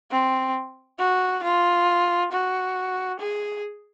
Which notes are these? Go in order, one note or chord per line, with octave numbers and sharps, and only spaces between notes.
C4
F#4
F4
F#4
G#4